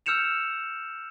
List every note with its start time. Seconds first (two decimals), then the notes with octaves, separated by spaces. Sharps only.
0.06 E6 F6 G6 C#7 E7 F7